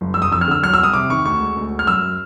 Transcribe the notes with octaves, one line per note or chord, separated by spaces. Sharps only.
F#1
F#1 E6
D#6
F2 E6
F6
D3 E6
F#3 F6
E6
C2 D#6
C3 D6
D#3 C#6
D2 C#6
G#3
D2
G#3
F6
F#2 E6